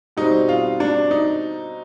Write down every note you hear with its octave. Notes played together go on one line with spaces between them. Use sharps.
B2 G3 C4 D#4
F4
D4
D#4